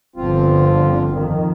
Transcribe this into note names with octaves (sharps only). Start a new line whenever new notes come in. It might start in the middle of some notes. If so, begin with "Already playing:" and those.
G1 D3 F3 C4 F4
F2 D#3